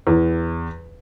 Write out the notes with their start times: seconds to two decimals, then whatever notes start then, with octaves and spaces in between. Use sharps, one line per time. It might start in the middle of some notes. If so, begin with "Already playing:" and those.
0.07 E2